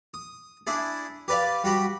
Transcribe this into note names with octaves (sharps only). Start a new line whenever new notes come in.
D#6
D4 E4 G#4
G4 B4 D5 F5
G3 F#4 G4 B5